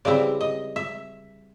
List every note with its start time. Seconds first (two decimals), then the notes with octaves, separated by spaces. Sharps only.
0.05 C#3 E3 G3 C4 E4 D5
0.41 D#5
0.76 E5